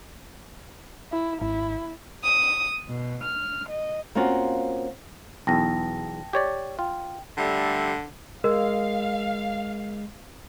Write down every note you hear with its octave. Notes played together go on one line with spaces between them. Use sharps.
E4
G#1 E4
D#6
B2
F6
D#5
A#3 C4 C#4 F4 F#4
B1 E2 G5 A5 A#6
G4 C#5 D5
F4 G5
D3 G3 A3
G#3 A#4 F5